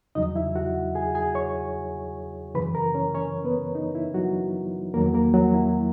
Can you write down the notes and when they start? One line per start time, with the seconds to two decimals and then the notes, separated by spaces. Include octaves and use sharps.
0.15 E2 C#3 F#3 D#4 D#5
0.36 E4 E5
0.56 F#4 F#5
0.95 G#4 G#5
1.15 G#4 G#5
1.35 C#5 C#6
2.55 F#2 C#3 E3 B4 B5
2.75 A#4 A#5
2.94 C#4 C#5
3.14 C#4 C#5
3.44 B3 B4
3.75 D#4
3.95 E4
4.14 F#3 F#4
4.94 E2 D#3 F#3 A#3 A#4
5.14 A#3 A#4
5.34 F#3 F#4
5.54 E4